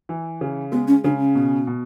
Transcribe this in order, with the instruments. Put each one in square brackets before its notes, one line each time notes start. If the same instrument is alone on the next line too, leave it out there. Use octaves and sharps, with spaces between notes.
[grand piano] E3
C#3
[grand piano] G#3 [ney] B3
[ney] C#4
[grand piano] C#3 [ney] D4
[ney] C#4
[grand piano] B2
B2